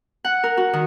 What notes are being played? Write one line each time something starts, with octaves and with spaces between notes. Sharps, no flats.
F#5
A#4
F#4
D#3